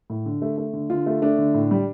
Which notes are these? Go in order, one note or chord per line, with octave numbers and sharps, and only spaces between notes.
A2
D3
A3
A3
D3
D3 F4
A3
A3 D4
D3
A2
G3